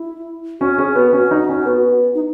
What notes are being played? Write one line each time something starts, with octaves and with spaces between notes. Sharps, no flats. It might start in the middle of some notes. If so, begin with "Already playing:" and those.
Already playing: E4
C#4 F#4
C#4 G#4
B3 F#4
C#4 F#4
D#4
C#4
B3
D#4